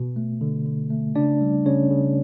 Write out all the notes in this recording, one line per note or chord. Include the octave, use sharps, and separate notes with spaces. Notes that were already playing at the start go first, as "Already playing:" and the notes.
Already playing: B2
A3
D3
D3
A3
C#3 D4 D5
G3
C#3 C#4 C#5
C#3